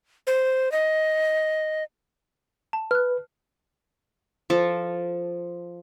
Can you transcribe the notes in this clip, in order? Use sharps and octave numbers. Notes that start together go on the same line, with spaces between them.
C5
D#5
A5
B4 F6 F#6
F3 A4